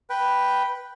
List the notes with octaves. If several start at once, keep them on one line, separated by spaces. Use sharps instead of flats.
B4 G5